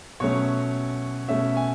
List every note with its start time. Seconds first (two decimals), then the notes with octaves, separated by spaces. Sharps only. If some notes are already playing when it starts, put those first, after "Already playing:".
0.20 B2 F#3 A3 C#4 C#5
1.28 B2 A3 C#4 E5
1.57 G#5